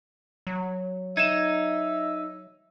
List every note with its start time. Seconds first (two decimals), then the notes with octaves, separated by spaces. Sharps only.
0.47 F#3
1.17 D#4 E5 G#6 E7